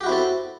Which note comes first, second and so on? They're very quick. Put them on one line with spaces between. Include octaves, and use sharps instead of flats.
G4 F#4 E4 C4 A4